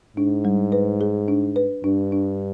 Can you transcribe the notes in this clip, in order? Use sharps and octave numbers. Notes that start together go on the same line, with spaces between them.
G#2 D4
G3
B4
G#4
D4
B4
G2 D4
D4